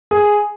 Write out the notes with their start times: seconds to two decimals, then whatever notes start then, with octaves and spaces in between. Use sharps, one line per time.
0.11 G#4